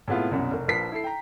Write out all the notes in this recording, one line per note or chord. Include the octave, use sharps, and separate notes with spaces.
A2 C3 G#3 B3 E4 F4
C2 F#2 B2
F1 A#4
A#1 F3 A#4 B4 B6 C7
E4 A4 C7
G5 A#5